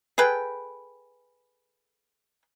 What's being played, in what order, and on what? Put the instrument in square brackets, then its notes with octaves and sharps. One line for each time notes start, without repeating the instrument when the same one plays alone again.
[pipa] G#4 A4 B4 G5